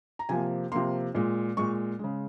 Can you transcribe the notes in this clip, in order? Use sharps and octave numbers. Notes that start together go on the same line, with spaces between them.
A#5
C3 F3 A#3 G#5
C3 F3 A#3 C6
A#2 G#3
A#2 G#3 C#6
C#3 G#3